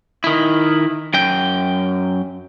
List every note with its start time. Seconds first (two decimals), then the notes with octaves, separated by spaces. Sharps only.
0.24 D#3 E4
1.14 F#2 G5